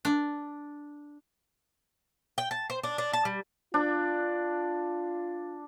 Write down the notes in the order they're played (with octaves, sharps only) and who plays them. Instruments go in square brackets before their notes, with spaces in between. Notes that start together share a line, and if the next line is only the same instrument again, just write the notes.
[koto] D4
[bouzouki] G5
A5
C5
D4
D4
A5
G3
[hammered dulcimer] D4 [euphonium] F4